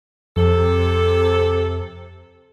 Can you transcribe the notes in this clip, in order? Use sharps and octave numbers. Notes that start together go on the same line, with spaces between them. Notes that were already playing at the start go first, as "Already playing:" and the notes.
F2 C3 A4